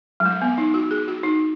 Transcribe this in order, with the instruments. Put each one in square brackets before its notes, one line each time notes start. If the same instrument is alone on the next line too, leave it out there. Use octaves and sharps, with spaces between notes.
[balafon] F#3
G#3
B3
D#4
F#4
G#4
F#4
D#4